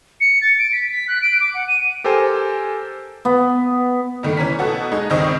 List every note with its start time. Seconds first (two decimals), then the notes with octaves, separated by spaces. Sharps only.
0.21 C#7
0.42 A6
0.59 D7
0.73 B6
0.90 B6
1.08 F#6
1.22 D7
1.41 D6
1.54 F#5
1.68 D#7
2.04 G4 A4 A#4 C5 G#5
3.25 B3
4.23 G2 D#3 A3
4.37 E3 C#4 A#5 B6
4.59 B2 B3 F#4 A4
4.92 G#3 D#4
5.10 C#2 G2 D#3 C4 D#5 C#6